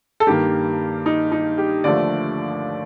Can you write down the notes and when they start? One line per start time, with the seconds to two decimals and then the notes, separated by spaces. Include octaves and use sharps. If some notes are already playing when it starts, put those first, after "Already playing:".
0.20 A4
0.27 G2 D#3 A#3 G4
1.06 D#4
1.32 D#4
1.58 G4
1.84 D#2 D3 F3 A3 D5